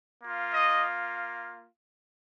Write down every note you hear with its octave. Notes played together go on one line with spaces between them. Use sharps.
A#3 F4
D#5 D#6